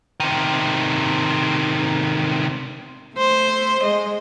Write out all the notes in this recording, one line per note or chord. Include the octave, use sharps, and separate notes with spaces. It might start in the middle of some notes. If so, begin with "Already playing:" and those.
C3 D#3
A3 C5
G#3 D#5